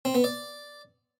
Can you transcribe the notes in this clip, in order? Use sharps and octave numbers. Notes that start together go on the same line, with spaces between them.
C4
B3
D5